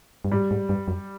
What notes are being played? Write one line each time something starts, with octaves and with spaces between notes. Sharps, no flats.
G2
G#2 G3
G#2
G2
F#2